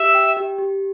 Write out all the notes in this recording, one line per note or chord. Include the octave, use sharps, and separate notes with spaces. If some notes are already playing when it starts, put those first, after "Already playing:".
Already playing: G4 E5
G5
G4
G4